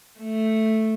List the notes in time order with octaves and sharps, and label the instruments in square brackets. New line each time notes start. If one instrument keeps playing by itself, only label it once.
[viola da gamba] A3